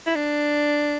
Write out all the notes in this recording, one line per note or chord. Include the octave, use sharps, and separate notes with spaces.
E4
D4